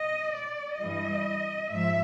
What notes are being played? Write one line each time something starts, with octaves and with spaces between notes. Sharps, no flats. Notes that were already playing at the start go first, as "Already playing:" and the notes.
Already playing: D#5
D5
G2 E3 G3 D#5
G#2 F3 E5